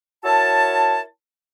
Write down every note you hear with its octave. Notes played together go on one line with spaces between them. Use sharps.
E4 F#4 A#4 C#5 A5